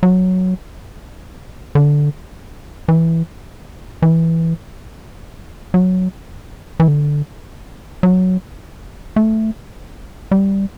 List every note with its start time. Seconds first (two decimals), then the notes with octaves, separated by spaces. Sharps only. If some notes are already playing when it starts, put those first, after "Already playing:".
0.03 F#3
1.75 D3
2.88 E3
4.02 E3
5.74 F#3
6.80 E3
6.88 D3
8.03 F#3
9.16 A3
10.31 G3